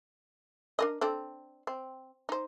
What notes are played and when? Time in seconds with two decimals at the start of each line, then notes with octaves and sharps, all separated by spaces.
0.79 D4 A#4 D#5
1.01 C4 D4 A4
1.67 C4
2.29 D#4 C5